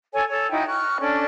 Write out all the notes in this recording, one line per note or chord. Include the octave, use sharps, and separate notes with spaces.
A4 C#5 G#5
A4 C#5
D#4 E4 F#4 G5
C#6 F6 F#6
C#4 D4 A4 D5